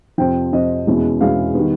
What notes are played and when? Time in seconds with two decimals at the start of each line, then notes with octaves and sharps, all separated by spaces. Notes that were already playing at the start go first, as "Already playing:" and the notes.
0.18 F2 C3 F3 G5
0.52 F2 C3 F3 D#5
0.87 E2 B2 G#3 C#4 E4
1.21 E2 B2 G#3 C#4 E4 F5
1.55 D#3 G3 B3